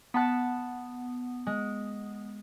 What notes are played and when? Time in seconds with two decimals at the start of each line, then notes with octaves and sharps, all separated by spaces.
0.14 B3 F#5 A5 B5
1.47 G#3